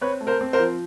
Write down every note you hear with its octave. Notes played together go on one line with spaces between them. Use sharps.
C4 B4 C#5
A3
A#4 C5
C4
A#4 C5
F3